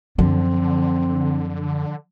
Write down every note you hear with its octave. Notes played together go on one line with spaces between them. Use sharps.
F#2 D3 F3 C4